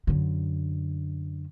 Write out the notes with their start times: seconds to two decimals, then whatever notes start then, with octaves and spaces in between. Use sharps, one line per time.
0.07 F#2 D3